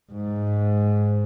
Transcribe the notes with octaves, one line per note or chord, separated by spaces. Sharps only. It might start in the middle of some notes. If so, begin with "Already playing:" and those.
G#2